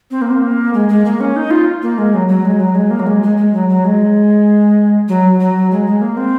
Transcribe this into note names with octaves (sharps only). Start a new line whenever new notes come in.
C4
A#3
C4
A#3
G#3
G#3
A#3
C#4
D#4
F4
A#3
G#3
F#3
F#3
G#3
F#3
G#3
A#3
F#3
G#3
G#3
G#3
F#3
F#3
G#3
F#3
F#3
G#3
G#3
A#3
C4